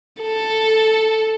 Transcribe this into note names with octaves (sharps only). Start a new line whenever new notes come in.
A4